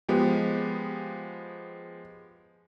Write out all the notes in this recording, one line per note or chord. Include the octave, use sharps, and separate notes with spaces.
F3 G#3 B3 G4